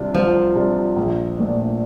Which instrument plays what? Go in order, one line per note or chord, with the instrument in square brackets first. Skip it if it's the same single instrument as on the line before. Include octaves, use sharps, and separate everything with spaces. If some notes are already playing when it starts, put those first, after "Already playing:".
Already playing: [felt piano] C3 G3 D4 F4
[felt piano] C2 [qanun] F3
[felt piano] C3 G3 D4 F4
A#1
A#2 A3 D4